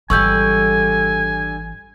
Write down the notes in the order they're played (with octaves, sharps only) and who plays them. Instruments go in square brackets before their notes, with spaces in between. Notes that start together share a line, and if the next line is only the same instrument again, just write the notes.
[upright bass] G#1 E3 [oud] D3 G3 [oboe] G#5 [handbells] C#6 E6 G6